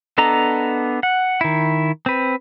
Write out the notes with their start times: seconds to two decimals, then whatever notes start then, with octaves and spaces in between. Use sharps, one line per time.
0.18 B3 D4 A4 D#5 A#5
1.03 F#5
1.41 D#3 E4
2.06 C4 B4